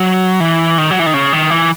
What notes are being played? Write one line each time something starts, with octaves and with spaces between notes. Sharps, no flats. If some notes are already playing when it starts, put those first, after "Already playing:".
Already playing: F#3
E3
D#3
F#3
E3
D#3
C#3
D#3
E3